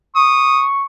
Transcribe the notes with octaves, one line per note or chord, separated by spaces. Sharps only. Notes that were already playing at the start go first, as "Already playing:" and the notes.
C#6 D#6